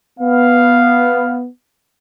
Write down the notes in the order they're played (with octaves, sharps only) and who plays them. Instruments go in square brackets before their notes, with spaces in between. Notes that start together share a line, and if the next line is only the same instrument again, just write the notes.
[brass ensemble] B3 [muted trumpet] F5